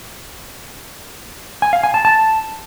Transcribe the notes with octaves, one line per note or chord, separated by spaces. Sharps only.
G#5
F5
G#5
A5
A5